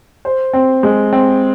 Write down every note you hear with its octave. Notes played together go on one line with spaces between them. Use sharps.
C5
C4
G#3
C4